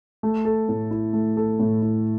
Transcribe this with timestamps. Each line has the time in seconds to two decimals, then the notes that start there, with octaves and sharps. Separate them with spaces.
0.23 A3
0.45 A4
0.69 A2
0.91 E4
1.13 A3
1.37 A4
1.59 A2
1.82 E4